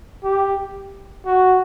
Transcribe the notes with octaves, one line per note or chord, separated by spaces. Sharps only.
G4
F#4